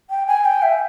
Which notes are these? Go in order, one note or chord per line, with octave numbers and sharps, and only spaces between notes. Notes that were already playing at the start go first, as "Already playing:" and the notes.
G5
G#5
G5
E5